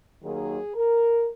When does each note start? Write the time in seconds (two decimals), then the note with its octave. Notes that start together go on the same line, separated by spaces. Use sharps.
0.22 D#2 D#3 F#3 A#3 G#4
0.74 A#4